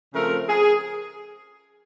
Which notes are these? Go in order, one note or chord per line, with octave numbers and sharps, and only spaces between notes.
C#3 F3 A3 C4 A#4
G#4